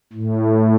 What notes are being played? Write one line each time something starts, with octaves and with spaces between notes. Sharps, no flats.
A2